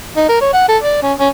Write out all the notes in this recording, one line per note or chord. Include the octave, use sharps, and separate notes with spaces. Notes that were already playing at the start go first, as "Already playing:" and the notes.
D#4
A#4
C#5
F#5
A4
D5
C#4
C#4